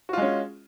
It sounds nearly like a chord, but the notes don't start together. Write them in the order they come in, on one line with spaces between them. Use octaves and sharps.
F#4 F4 G#3 C#4